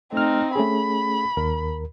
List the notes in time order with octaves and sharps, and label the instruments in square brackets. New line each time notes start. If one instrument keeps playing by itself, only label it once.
[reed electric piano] A3 F6 [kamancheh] C4 D#4
[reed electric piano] A3 C#4 G#4 [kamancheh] B5
[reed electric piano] D#2 A#4